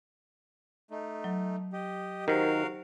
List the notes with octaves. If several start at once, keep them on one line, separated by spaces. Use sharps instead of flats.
A3 D#4
F#3
G4 D#5
D#3 F#4 G4 A#4 C5 F5